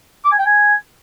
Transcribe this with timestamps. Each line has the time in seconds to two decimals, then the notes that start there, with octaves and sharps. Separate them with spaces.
0.24 D6
0.32 G#5
0.39 G5
0.46 G#5